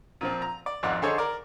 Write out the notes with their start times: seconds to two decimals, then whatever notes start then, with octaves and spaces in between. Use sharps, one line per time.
0.21 A#2 F3 C4
0.42 A#5
0.66 D5
0.83 G#1 F2 D#4 D5 F#5 F#6
1.02 D3 D#4 G#4 A4 C5 C#5
1.18 A#4 D5